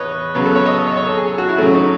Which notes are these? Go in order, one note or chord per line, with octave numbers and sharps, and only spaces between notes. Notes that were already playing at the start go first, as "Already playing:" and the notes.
Already playing: E2 B4 C#5 D#5
C#3 F#3 B3 B4
A4
C#5
D#5
C#5
C#5
A4
G#4
G#4
F#4
E4
C#3 F#3 A3 C#4
D#4